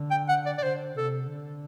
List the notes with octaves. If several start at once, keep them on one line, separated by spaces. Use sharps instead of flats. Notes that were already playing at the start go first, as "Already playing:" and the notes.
Already playing: D3
G5
F#5
D5
D5
D3 C5
C3 A4
D3